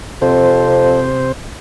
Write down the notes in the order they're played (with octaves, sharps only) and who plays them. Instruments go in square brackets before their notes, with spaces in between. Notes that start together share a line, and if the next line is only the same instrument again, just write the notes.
[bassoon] F2 [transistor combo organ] C3 C5